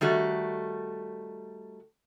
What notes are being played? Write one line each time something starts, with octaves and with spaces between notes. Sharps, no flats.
D#3 G3 A3 F#4